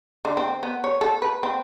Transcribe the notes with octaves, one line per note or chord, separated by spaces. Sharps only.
D3
C4
B3
C#5
A4
B4
C4